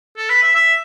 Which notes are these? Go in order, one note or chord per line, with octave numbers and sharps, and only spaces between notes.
A4
B4
E5
E5